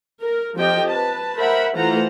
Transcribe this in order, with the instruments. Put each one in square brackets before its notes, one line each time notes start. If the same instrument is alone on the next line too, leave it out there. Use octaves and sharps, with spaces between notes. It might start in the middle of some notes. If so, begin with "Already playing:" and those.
[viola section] A#4
F3 C4 G4 A4 D#5 G5
B4 A5
A#4 C5 E5 F#5 B5
E3 A3 F4 C5 F#5 A#5